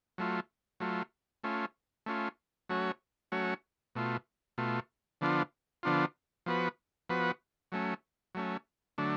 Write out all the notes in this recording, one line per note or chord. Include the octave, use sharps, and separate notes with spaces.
F#3 A3 F4
F#3 A3 F4
A3 C#4 F4
A3 C#4 F4
F#3 A3 C#4 F#4 C#5
F#3 A3 C#4 F#4 C#5
B2 A3 F4
B2 A3 F4
D3 F3 B3 D4 F4
D3 F3 B3 D4 F4
F3 B3 F#4 B4
F3 B3 F#4 B4
F#3 A3 C#4
F#3 A3 C#4
D3 F#3 A3 D4